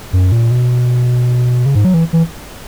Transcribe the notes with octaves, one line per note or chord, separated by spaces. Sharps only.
F#2
A#2
B2
C#3
G#2
F#3
E3
E3